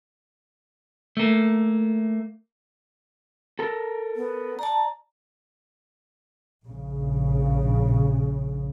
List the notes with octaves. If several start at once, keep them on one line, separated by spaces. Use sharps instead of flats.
A3 A#3
A4 A#4
B3
D5 A5 A#5
A#1 C#3